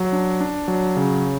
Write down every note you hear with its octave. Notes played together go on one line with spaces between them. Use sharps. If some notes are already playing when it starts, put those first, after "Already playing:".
Already playing: F#3
D4
D4
F#3
C#3